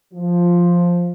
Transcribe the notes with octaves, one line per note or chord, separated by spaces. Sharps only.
F3